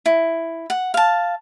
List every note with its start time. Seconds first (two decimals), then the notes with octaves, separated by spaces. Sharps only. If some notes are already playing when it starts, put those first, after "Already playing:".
0.06 E4
0.70 F#5
0.94 F5 A5